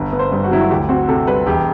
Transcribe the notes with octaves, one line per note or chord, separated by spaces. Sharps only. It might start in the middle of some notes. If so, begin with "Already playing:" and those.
Already playing: G1 B3
B3
C5
G2
F#4
F#3 E4
F#4
D2 G4
C4 F#4
C3 A4
G3 B4
E1 G4